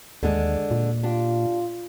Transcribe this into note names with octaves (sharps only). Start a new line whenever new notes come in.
D#2 D3 G#3 D4
A#2
D4 F4 G4